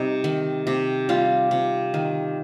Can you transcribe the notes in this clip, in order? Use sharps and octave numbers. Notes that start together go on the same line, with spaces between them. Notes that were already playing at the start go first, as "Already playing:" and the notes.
Already playing: C3 G3 D#4
D#3
C3
G3 F4
C3
D#3